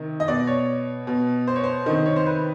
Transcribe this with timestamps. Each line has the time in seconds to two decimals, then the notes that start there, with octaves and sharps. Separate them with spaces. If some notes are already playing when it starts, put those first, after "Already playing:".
Already playing: C3 D#3
0.20 D#5
0.28 B2 D5
0.47 C#5
1.07 B2
1.47 C5
1.56 C#5
1.64 C5
1.86 C3 D#3
2.06 C#5
2.16 C5
2.26 B4